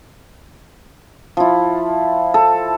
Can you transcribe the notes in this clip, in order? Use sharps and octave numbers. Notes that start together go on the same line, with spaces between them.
F3 E4
A4